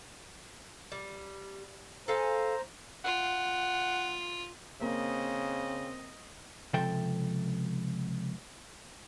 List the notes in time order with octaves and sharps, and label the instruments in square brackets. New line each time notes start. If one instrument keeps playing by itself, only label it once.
[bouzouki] G3
[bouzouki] A4 F5 G#5 [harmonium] C5 A#5
[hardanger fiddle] F4 [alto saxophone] F#5
[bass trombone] C#3 [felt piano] A#3 [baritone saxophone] C4 [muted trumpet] D#5
[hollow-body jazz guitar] C#2 C3 F3 A4 E5 G5